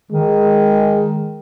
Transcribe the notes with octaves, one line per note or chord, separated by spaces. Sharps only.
D#3 G#3